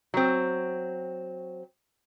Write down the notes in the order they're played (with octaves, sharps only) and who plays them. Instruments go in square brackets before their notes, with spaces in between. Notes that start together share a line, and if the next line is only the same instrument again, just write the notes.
[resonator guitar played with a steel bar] F#3 C4